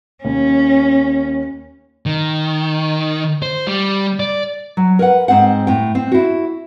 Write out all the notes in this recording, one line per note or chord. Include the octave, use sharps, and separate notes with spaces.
D#2 C#4
D#3
C5
G3
D5
F#3
A#4 B4 F#5
G#2 C4 F#5
A2 G5
C4
E4 F#4